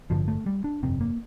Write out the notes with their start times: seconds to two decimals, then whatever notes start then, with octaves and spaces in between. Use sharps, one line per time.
0.10 A1 G2 D3 F3
0.28 A3
0.46 G3
0.64 D4
0.83 G1 F2 C3 C4
1.01 A#3